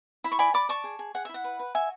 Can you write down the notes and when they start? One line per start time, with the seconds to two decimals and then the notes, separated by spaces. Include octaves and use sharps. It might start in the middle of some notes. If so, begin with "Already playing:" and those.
0.24 E4 B5
0.32 C#6
0.39 D5 G#5 B5
0.54 D5 B5 D6
0.69 D5 A5 C#6
0.84 G#4
0.99 G#4
1.15 G#4 F#5
1.25 E5
1.29 E4
1.34 F#5
1.44 B4
1.59 B4
1.75 F#4 E5 G#5